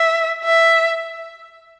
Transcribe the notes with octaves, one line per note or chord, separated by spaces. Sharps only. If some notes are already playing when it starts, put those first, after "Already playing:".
Already playing: E5
E5